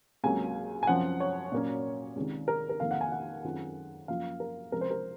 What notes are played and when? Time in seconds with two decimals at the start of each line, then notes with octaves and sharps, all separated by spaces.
0.24 C#2 C3 F#3 A#3 G#5
0.83 G#5
0.87 F#2 F3 C4 F#5
1.20 C#5
1.52 A#2 F#3 A#3 C#4
2.16 C#2 C3 D#3
2.48 A#4
2.69 A#4
2.80 F2 D#3 A#3 D#4 F5
2.91 F#5
3.01 G#5
3.12 F#5
3.44 F#2 D#3 G#3 C4 F4
4.08 F#2 F3 A#3 F4 F5
4.40 A#4
4.72 C#2 C3 F3 C4 A#4
4.81 C5
4.91 A#4